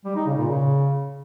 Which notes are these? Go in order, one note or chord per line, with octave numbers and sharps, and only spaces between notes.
G3
D#4
C#3
A#2
C#3